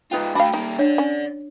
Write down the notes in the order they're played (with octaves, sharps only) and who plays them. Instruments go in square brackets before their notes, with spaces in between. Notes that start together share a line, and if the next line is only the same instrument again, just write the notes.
[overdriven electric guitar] G#2 F4 [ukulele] D#4 B4 G5
[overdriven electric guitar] A3 F#4 [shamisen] D4 F5 [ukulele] G5 A5 B5
[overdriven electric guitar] G3 A#3 [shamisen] D#4
[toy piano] D4 C#5 [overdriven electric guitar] D5 F#5
[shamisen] C#4